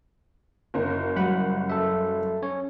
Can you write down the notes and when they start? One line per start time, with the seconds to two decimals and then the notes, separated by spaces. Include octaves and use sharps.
0.74 F#1 C#4 A#4
1.16 F#3 G3 F#5 B5
1.70 A4 E5
2.42 C#4 C#5